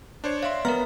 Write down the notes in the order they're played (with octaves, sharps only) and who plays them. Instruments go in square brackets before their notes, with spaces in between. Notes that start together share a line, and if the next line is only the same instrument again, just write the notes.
[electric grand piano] D4 C5 C#5
[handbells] C#5 F5 [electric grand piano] D5 E5 C6
[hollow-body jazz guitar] B3 [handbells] A#4 E5 F6 [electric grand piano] A#5